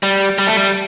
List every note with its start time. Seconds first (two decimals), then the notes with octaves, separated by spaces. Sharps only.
0.03 G3
0.39 G3
0.47 A3
0.57 G3